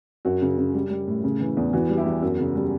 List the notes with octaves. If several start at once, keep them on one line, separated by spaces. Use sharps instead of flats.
F#2 F#4
C#3
C#3
G3
G3
A2
C#3
E3
E2
E3 F#4
G3
E4 G4
E2
F#2 F#4
C#3
G3